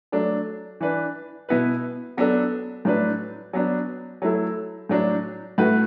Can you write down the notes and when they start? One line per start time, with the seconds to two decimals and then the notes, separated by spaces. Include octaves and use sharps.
0.12 F#3 A3 D4
0.81 E3 D4 B4
1.49 B2 B3 E4 B4
2.17 F#3 B3 D4 A4
2.85 A2 F#3 D4 B4
3.53 F#3 B3 D4
4.22 F#3 A3 E4 A4
4.89 A2 F#3 D4
5.58 A2 A3 F#4 B4